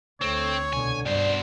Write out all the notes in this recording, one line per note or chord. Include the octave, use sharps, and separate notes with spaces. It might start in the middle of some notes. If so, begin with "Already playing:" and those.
D2 A3 C4 C#5
C2 B2 D3 G#5
G2 B2 C5 D5